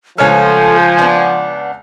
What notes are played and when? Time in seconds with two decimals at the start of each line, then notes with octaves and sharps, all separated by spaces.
0.18 C#2 F3 A3 B3 A4 C#5 G#5 F6
0.99 B3 D4